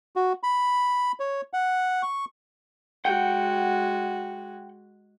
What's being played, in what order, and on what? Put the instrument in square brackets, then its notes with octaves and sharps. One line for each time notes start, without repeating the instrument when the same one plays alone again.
[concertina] F#4
B5
C#5
F#5
C#6
[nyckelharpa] G#3 F#4 [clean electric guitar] F#5 G5